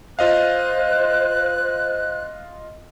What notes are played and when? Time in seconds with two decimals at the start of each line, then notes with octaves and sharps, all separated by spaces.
0.19 F4 C5 D#5 F5 F#6